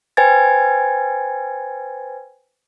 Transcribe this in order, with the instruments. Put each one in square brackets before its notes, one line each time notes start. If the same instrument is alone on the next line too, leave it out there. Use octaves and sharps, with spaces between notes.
[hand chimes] B4 C5 G5 G#5 G#6 A6